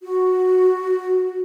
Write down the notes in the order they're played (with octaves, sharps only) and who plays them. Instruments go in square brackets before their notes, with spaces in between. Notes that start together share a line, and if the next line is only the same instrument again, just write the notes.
[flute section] F#4